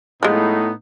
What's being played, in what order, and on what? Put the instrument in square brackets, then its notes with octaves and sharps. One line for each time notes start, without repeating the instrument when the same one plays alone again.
[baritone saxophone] A2 [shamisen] F3 G#3 [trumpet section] B3 D#4